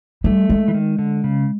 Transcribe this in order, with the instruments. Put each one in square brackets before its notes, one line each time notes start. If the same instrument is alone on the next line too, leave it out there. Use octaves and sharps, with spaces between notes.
[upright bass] G3 [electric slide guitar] A3
[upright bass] G#3
[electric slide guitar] E3
D#3
D3
C#3